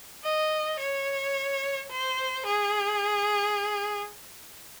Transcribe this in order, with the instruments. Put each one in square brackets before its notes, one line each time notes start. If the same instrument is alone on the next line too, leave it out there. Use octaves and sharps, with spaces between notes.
[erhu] D#5
C#5
C5
G#4